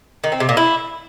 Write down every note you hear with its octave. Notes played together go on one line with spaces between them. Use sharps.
D#3
C4
C3
A#2
E4